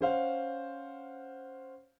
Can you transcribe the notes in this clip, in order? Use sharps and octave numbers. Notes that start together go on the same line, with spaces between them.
C#4 C5 F5 F#5